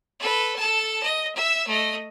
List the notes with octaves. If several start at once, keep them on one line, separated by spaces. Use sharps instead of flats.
A4 B4
A4 A5
D#5
E5 E6
A3 D#5